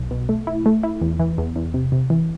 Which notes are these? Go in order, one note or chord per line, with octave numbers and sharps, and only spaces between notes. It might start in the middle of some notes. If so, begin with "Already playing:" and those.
Already playing: B1
B2
A3
E4
A3
E4
E2
E3
E2
E2
C3
C3
E3